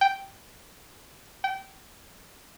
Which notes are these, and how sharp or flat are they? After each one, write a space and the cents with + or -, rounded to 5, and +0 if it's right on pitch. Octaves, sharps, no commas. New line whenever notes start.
G5 -5
G5 -25